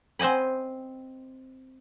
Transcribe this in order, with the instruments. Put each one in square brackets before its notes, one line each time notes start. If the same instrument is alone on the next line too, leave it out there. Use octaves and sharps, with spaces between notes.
[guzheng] C4 C5 D#5 G#5 B5